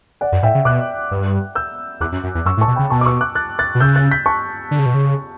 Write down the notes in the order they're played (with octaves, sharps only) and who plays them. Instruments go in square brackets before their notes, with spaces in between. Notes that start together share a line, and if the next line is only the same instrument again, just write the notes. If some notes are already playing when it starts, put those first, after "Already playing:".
[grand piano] D5 F#5
[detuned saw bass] F#2
[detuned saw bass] A2 [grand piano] E5 G5
[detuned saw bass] C#3
[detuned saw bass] B2 [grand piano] D6 F#6
[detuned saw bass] G2
[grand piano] E6 G6
[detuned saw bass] E2 [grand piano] D6 F#6
[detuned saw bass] F#2
F#2
E2
[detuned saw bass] F#2 [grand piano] C#6 E6
[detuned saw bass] A2
[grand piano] A5 C#6
[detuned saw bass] B2
[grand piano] G5 B5
[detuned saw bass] C#3
[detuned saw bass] B2 [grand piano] A5 C#6
[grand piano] D6
C#6 E6
D6 F#6
F#6 A6
F#6 A6
[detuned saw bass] B2
[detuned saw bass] C#3 [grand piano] E6 G6
[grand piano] F#6 A6
G6 B6
A5 C#6
[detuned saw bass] D3
C#3
B2
C#3